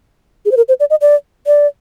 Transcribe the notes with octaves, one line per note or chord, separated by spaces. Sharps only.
G#4
C5
A#4
C5
D5
D#5
D5
D5